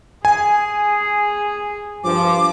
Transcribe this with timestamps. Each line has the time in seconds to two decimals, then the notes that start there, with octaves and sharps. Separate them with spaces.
0.25 G#4 G#5
2.04 G2 F3 D6